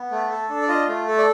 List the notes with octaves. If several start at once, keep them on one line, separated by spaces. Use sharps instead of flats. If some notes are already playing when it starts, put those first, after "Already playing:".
Already playing: B3
A3
A4
D4
D5
F4 D#5
A3
A4
D5